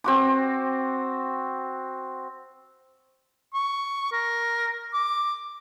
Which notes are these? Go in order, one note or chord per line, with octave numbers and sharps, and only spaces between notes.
C4 F#4 D6
C#6
A#4
D6